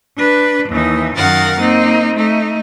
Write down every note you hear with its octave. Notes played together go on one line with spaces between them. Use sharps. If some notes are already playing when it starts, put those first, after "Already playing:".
D4 B4
D#2 E3 D#4
F#2 D#3 A#4 F5 F#5 A6
A#3 C4 D#4
A3 D#4